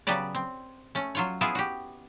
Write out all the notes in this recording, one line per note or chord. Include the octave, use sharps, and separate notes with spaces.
C#3 F#3 B3 G4 B4 D5
C4
A3 C#4
F#3 F4 C#5
B3 E4 F4 G#4 E5
F#4 G4